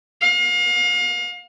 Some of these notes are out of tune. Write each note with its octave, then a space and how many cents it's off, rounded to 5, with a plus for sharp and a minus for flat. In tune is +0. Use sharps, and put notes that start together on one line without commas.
F5 +35